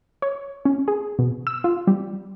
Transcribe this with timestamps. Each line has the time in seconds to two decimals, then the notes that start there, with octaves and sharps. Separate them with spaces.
0.22 C#5
0.65 C#4
0.88 G#4
1.19 B2
1.47 E6
1.64 F4
1.87 G3